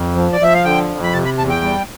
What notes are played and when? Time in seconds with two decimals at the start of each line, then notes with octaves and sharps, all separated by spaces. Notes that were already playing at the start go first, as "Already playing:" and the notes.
Already playing: F2
0.16 F3
0.33 D5
0.41 F3 E5
0.54 F5
0.64 D3 G5
0.89 F2
1.03 B5
1.13 C3 A5
1.25 B5
1.38 E2 A5
1.50 G5
1.62 G3